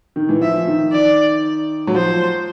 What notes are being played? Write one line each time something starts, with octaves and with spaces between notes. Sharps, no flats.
D#3
E3
F3 E5
D#3
D5
F#3
F3 C5